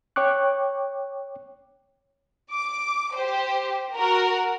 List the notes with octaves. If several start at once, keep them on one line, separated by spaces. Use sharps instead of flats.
C#5 G5 C#6 D6 F#6
D6
G4 C5
F#4 A#4